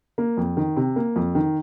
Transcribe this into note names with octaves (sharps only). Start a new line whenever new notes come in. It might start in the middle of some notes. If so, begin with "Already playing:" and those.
A#3
F2
D#3
C3
A#3
F2
D#3